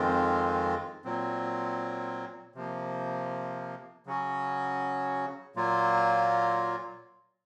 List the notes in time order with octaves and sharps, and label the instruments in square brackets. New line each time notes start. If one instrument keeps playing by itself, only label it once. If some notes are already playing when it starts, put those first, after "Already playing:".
Already playing: [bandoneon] F2 D#3 G#3 C4 F4
A#2 F#3 C4
C3 F3 A#3
C#3 F#3 C#4 F#4
A#2 F#3 A#3 F4